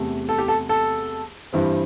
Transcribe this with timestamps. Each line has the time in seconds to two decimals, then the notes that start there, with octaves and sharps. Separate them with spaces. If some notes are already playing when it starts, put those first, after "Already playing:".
Already playing: E2 C3 A3
0.29 A4
0.38 G4
0.48 A4
0.69 A4
1.53 G2 E3 C4